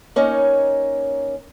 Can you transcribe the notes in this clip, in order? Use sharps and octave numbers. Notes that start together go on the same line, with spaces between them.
A#3 C#4 D#4 C#5